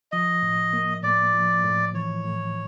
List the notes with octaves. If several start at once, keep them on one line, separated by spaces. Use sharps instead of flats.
F3 D#5
A2
A#3
A2 D5
F3
A2
E3 C#5
A2